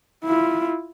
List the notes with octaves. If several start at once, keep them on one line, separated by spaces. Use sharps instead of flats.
E4 F4